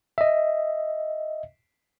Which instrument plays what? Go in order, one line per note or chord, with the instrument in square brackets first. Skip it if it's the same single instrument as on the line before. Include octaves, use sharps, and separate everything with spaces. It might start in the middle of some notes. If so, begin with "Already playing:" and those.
[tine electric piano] D#5 E5